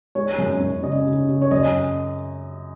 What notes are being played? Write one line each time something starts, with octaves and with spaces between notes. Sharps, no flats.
G#3 C#5
F#2
F#2
C#3 D#5
C#3
C#3
C#5
F#2 D#5